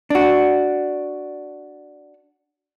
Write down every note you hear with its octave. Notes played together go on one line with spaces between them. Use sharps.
D4 F#4